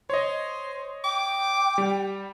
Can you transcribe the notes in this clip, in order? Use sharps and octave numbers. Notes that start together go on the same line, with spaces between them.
C5 C#5 D#5
G5 D6
G3